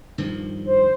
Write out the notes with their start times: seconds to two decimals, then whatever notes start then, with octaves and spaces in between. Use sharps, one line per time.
0.18 G2 D#3 F3
0.65 C5